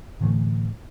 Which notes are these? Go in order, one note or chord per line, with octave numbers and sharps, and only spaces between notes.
A2 D3 E3 A3